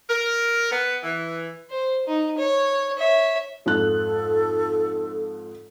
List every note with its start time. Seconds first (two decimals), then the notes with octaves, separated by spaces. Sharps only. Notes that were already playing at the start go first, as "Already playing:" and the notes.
0.09 A#4
0.71 B3
1.03 E3
1.70 C5
2.07 D#4
2.38 C#5
2.98 C#5 E5
3.66 F2 G#2 A4 F#6